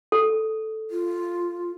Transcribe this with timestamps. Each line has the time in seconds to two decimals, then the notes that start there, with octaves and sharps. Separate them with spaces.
0.12 A4
0.91 F4